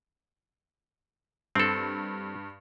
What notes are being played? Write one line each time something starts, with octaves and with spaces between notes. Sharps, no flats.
G2 C4 A4